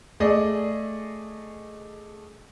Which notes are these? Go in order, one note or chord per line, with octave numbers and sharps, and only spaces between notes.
A3 G#4 D5 D#5